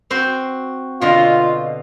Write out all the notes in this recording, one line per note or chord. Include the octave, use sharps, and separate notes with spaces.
C4 F#4 C5
B2 D3 F4 D#5